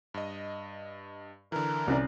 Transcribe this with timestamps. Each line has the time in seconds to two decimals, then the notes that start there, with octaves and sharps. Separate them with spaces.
0.14 G2 D#5
1.52 D3 E3 A#4
1.87 C2 C#4 D5